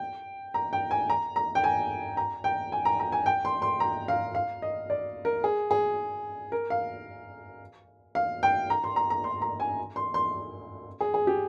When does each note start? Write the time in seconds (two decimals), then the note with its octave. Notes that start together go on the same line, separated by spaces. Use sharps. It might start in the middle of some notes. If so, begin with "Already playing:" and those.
Already playing: G5
0.54 A#5
0.73 G5
0.91 G#5
1.10 A#5
1.36 A#5
1.55 G5
1.64 G#5
2.17 A#5
2.44 G5
2.72 G#5
2.85 A#5
3.00 A#5
3.12 G#5
3.26 G5
3.45 C6
3.62 C6
3.80 A#5
4.08 F5
4.35 F5
4.62 D#5
4.90 D5
5.25 A#4
5.44 G#4
5.71 G#4
6.52 A#4
6.70 F5
8.15 F5
8.43 G5
8.70 A#5
8.84 C6
8.96 A#5
9.10 A#5
9.24 C6
9.42 A#5
9.60 G#5
9.96 C6
10.14 C6
11.01 G#4
11.14 G#4
11.27 G4